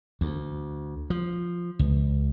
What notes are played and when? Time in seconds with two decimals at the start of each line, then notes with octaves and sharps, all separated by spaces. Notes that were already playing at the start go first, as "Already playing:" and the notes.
0.21 D2
1.10 F3
1.79 C#2